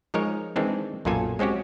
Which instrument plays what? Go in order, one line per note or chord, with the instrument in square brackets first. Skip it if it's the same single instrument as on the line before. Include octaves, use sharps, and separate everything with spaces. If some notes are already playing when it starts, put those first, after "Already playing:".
[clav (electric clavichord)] F3 G#3 D#4 A#4 C#5
D#3 E3 G#3 C4 D4
B1 F#2 A#2 F4 A4 G#5
G#3 C4 C#4 F#4 G4